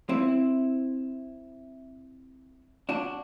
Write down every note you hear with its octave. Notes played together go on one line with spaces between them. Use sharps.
C4 E4
D4 F#4